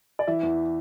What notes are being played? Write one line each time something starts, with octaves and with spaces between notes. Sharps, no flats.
D5
E3 E5
E2